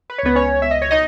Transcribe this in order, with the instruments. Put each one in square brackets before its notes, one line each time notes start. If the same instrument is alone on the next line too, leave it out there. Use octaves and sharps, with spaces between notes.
[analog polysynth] B4
C#5
C#2 B3 B4
C#4 C#5
B2 E5
D#5
C#5
D#4 D#5